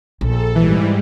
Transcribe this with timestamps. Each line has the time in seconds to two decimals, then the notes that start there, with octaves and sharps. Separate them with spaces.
0.21 A#1 A4
0.55 G#2 E3 G3